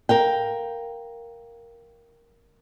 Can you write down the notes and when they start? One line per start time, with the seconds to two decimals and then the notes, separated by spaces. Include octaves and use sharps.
0.09 A#4 F5 G5